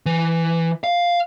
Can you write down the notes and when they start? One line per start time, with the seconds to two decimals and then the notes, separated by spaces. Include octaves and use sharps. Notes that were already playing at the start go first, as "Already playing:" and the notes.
0.06 E3
0.84 F5